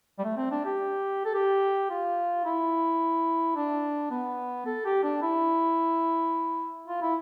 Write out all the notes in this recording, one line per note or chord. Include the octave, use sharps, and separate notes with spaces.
G3
A3
C4
D4
G4
A4
G4
F4
E4
D4
B3
A4
G4
D4
E4
F4
E4